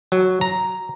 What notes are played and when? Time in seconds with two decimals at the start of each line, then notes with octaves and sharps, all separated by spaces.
0.12 F#3
0.41 A#5